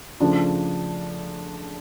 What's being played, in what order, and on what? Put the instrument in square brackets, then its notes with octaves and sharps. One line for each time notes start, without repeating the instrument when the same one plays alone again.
[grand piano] C#3 F3 A3 D4 F4